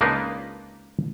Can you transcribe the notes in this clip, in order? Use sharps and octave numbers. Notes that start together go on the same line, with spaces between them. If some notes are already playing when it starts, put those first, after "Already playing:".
C#2 A#3 D4 D#4 F4 B4